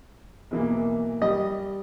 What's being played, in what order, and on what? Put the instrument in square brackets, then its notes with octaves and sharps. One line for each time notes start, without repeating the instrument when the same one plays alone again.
[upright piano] B1 E3 A#3
[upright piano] G3 [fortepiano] D#5